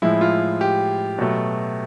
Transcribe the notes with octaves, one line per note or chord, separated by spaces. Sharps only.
A2 F3 G#3 E4
F4
G4
B2 F#3 A3